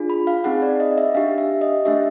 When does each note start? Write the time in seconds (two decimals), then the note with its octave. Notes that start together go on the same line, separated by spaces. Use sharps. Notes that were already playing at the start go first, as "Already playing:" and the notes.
Already playing: D4 F4 G#4
0.10 B5
0.27 F5
0.44 C4 D#4 G#4 F#5
0.62 D5
0.80 D#5
0.98 E5
1.15 D4 G4 F5
1.38 E5
1.61 D#5
1.85 A3 D4 G4 E5